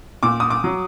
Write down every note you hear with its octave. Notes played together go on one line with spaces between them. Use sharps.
A#2 D6
D#6
D6
F#3